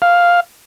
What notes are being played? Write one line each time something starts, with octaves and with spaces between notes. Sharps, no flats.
F5